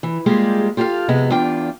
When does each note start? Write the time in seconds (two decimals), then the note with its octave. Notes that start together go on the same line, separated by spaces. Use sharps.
0.03 E3
0.26 G3 G#3 A#3 F4 G4 G#4
0.77 F4 G4 A4 E5 F5
1.08 F2 C3 G#3 B3
1.30 E2 D4 F4 G5